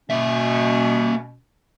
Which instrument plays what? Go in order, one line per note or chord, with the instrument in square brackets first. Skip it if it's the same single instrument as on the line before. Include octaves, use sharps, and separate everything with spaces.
[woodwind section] B2 C#4 [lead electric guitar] A#3 E5